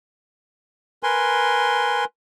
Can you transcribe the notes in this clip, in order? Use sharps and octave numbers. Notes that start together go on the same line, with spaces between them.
A#4 B4 G#5 C6